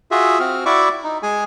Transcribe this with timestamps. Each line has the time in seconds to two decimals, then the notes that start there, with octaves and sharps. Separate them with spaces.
0.11 F4 F#4 G#4 E5
0.40 C4 F#4 F6
0.66 E4 F#4 D5 E5 C#6 D6
1.04 D#4
1.23 G#3 G#4 G#5